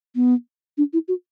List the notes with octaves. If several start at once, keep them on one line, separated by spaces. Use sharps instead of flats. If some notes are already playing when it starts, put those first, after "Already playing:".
B3
D4
E4
F#4